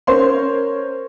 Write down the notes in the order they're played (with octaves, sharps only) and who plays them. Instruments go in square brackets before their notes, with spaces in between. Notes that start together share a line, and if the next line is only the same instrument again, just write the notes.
[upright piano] C#4 A#4 C5 C#5 C6